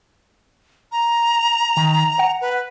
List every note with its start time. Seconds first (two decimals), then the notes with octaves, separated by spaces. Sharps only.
0.92 A#5
1.77 D#3
2.19 F#5
2.41 B4